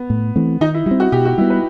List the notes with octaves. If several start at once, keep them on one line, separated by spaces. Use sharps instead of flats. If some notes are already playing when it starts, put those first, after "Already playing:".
Already playing: B3
A2
E3 A3 C4
D#3 D#4
E4
G3 E4
C4
F#4
B2 G4
F#4
G3 B3 E4
B4